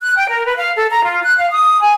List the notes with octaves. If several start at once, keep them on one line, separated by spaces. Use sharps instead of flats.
F#6
G5
A#4
B4
F5
A4
A#5
F4
F#6
F5
D#6
G#5